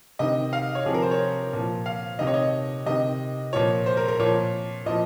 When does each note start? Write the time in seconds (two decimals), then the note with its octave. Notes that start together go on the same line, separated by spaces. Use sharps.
0.19 C3 D#3 D#5
0.53 F5
0.75 C#5
0.86 C3 F3 G#4
0.94 A#4
1.02 C5
1.11 C#5
1.53 A#2 F3
1.86 F5
2.19 C3 D#3 D#5
2.27 C#5
2.34 D#5
2.86 C3 D#3 D#5
3.53 A#2 F3 C#5
3.86 C5
3.97 A#4
4.08 A#4
4.19 A#2 F3 C#5
4.86 A#2 F3 D#5